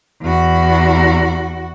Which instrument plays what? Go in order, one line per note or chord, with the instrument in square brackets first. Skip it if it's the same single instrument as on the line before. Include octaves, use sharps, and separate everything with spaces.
[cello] E2 F#4